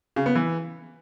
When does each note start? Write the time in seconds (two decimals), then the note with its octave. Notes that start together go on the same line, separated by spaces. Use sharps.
0.16 C#3
0.26 B3
0.35 E3